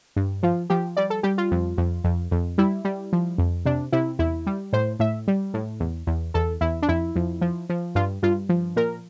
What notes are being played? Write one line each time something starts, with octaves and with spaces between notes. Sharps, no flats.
G2
F3 F4
F3 G4
G3 D5
A4
G3 G4
F4
F2
F2
F2
F2
G3 E4
G3
F3
F2
C3 D4
C3 E4
E2 E4
G3
A2 C5
A2 E5
G3
A2
E2
E2
E2 A4
E2 E4
D4
F2 E4
F2
F3
F3
G2 F4
G2 F4
F3
A#2 A#4